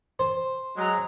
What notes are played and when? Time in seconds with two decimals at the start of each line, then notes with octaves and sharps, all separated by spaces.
0.19 C5
0.76 F#3 G#3 A#5